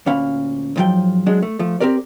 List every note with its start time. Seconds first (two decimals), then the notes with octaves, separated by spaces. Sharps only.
0.06 D2 A#2 C#4 F5 B5
0.76 C2 G#2 F3 F#3 G5
1.26 F#3 G#3 D4
1.42 A3
1.59 F3 A3
1.80 C4 F#4 G4 A#4 D5